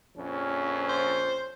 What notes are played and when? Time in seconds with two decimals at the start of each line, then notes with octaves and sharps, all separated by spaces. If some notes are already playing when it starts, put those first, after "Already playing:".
0.15 A#1 F2 C#4
0.89 C5